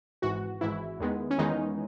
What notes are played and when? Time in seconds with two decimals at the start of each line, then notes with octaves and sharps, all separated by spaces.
0.22 G#1 G#2 E3 F#4
0.61 G#1 G#2 E3 E4
1.00 E2 D#3 G#3 B3
1.30 C#4
1.38 E2 D#3 G#3 B3 D#4